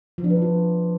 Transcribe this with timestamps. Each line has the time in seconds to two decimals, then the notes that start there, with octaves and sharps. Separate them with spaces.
0.18 F3
0.24 D4
0.30 B4
0.36 F3
0.42 F4